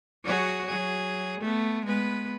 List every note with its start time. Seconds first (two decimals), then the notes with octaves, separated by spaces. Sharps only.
0.24 F#3 F#4 G#4
0.69 F#3 G#4
1.41 A3 B3
1.86 G#3 B3 B4